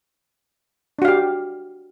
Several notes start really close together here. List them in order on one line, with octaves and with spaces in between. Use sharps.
D4 F#4 F5 G4